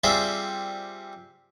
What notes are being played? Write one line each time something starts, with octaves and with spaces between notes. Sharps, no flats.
G3 C4 F4 G#4 D5 E5